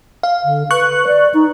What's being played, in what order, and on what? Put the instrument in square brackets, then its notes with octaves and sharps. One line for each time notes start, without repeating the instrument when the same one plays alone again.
[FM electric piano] F5
[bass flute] D3
[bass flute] B4 [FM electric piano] C#6 F#6
[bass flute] D5
D#4